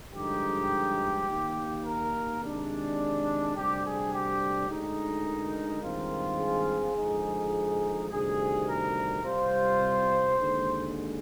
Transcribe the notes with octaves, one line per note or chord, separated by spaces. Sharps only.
G2 D3 F3 G#3 D#4 G4
D#2 D#3 A#3
A#4
C3 D#3 G#3 D4
D2 C3 G3 D4 G4
G#4
G4
D2 D3 G#3 D#4
A#4
G2 D#3 G#3 C4 F4
G#4
D3 F3 G#3 D#4
D2 C3 D#3 G3 G#4
A#4
C2 C3 G3 C4 F4 C5
D#2 D3 G#3